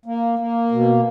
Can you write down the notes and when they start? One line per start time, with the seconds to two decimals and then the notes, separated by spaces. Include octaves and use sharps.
0.06 A#3
0.39 A#3
0.72 B2